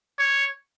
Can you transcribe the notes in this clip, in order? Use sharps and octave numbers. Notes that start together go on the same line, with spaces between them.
C#5